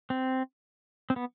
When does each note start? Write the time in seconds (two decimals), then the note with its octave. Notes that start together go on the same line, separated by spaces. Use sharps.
0.10 C4
1.10 C4
1.16 B3